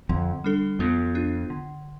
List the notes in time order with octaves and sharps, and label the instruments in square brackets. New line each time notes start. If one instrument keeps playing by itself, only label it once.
[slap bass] F2 [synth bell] D3
[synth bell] G3 D4 A4
[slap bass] F2 [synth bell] B3
[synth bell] D4 F4
D3